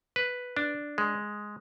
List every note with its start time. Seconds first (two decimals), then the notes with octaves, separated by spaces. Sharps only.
0.16 B4
0.57 D4
0.98 G#3